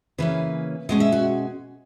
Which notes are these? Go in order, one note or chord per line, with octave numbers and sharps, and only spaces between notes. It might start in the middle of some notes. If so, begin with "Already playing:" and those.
C#3 E3 A#3 C#4 B4
B2 G#3 C#4 D#5
E5
F#4